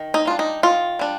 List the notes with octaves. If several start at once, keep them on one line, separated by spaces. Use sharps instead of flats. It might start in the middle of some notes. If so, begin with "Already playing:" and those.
Already playing: D#3
D#4
G3 D4 F4
D#4
D#3 F4
G3 D4